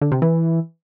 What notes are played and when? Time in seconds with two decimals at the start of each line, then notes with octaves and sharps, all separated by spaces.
0.01 D3
0.12 C3
0.22 E3